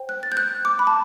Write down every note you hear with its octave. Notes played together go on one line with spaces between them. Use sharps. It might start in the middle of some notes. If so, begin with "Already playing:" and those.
Already playing: C5 G5
F#6
A6
G6
F#6
D6
B5
A5